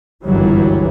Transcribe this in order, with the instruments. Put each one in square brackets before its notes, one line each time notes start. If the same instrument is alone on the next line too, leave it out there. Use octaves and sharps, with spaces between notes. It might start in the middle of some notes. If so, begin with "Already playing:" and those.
[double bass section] G1 C#2 F#2 E3 F#3 G3